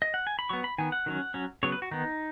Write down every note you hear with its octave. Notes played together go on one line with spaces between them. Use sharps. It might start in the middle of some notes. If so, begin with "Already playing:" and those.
D#5
F#5
G#5
B5
F#3 B3 C#6
B5
D#3 B3 G#5
F#5
D#3 F#3 C#4
F#3 C#4
C#3 F#3 B3 C#5
B4
F#4
D#3 B3 D#4